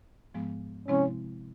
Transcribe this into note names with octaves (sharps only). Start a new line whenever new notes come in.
G#2 F3 G#3 B3
C3 F3 G#3 C4 C#4 E4